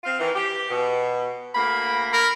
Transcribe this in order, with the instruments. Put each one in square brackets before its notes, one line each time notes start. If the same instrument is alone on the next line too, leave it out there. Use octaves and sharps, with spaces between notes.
[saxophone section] C4 F4 F5
D#3 E3
G4
B2
[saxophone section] D2 A#3 [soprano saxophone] B5
[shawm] A#4 [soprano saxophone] B5